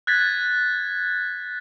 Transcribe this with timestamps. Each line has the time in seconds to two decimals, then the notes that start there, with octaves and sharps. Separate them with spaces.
0.07 F#6 G#6 A6 B6